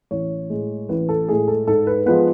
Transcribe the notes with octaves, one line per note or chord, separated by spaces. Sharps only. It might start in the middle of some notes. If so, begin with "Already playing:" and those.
A1 C#5
A2 G#3
A1 B4
A4
A2 G#3 G#4
A4
G#2 A4
B4
F3 G#3 B3 B4